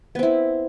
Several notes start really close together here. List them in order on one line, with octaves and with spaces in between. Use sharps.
B3 C4 E4